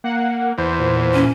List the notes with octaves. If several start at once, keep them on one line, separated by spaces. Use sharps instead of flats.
A#3 F#5
E2 C5
A#2
C#4